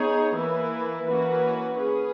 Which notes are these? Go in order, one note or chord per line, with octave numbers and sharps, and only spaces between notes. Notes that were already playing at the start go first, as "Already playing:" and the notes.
Already playing: B3 D#4 G#4 C#5
E3 A#3 E4 B4
E3 A#3 C#4 F#4 B4
C#4 G#4 B4